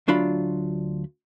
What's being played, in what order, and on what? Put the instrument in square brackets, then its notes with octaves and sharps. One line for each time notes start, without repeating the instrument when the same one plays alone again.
[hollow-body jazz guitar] D2 F#3 D4 F4 B5